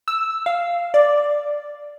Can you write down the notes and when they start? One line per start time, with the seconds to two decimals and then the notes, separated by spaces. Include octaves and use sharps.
0.08 E6
0.46 F5
0.94 D5